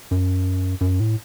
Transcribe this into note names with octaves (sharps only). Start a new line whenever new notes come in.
F#2
F#2
A2